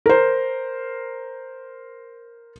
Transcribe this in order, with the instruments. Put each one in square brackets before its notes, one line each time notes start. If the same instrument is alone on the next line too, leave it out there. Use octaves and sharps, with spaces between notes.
[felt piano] A#4 C5